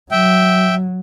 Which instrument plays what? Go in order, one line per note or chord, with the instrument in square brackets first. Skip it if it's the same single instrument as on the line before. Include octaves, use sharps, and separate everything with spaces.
[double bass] F#3 [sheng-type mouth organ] E5 G5